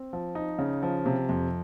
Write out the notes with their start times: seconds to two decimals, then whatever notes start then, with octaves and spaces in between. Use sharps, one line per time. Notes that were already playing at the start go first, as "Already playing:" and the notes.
Already playing: C4
0.13 F3
0.35 D#4
0.59 C#3
0.83 F3
1.06 C3
1.29 F2